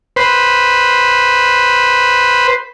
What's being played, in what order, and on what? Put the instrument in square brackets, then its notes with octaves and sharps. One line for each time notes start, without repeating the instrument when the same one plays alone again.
[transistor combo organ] B4 C5